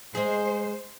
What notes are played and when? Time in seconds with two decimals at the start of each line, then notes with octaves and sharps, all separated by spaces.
0.15 G#3 G#4 C5